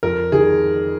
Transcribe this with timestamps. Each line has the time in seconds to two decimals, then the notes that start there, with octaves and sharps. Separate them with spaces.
0.03 F2 A#4
0.32 D#3 G#4